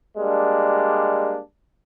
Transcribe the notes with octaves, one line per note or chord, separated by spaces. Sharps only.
G3 G#3 A#3 D4